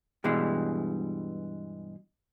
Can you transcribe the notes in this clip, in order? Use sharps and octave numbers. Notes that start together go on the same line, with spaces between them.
G2 B2 E3 G3 G#3